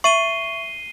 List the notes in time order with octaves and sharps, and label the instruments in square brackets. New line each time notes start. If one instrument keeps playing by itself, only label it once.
[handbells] E5 C#6 [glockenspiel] C7 D#7 G7